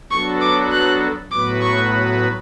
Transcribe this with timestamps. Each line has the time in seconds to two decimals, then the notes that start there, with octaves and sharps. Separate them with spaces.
0.11 F#3 B3 D4 F#4 A4 C#6
0.41 D6
0.72 F#6
1.31 A2 F#3 B3 F#4 B4 D6
1.61 C#6